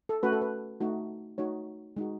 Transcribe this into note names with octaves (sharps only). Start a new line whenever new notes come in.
A4
A3 C#4 F#4 B4
A4
B4
A3 D#4 F#4
A3 D#4 F#4 C#5
G#3 D#4 F#4